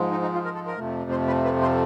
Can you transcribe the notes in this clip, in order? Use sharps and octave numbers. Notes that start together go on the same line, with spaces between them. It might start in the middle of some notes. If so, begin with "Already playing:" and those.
Already playing: G#2 F3 G#3
D#4
D#4
F4
A#4
A4
A#4
F2 C3 F3 A3
C5
B4
B4
C5